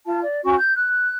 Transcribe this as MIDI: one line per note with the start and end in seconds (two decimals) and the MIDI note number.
0.04 0.20 65
0.04 0.20 81
0.21 0.39 74
0.43 0.54 61
0.43 0.54 66
0.43 0.54 85
0.56 0.72 91
0.75 1.16 90